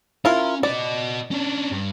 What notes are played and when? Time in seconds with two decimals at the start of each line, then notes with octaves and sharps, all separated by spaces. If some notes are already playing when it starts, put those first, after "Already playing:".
0.25 C#4 E4 F4 A#4
0.63 F#4 D5 D#5
1.31 C#4 D4
1.71 G2